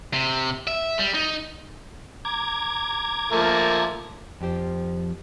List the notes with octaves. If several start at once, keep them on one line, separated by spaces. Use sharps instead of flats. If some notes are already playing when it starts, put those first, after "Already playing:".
C3
E5
G3
D#4
A#5 D6 G#6
F3 A3 A#3
F2 F3 G4 C5